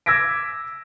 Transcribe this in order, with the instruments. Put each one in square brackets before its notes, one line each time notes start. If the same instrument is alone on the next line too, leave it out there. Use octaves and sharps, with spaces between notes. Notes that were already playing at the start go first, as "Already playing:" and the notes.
[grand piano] D6 E6 G#6 A#6 B6 D7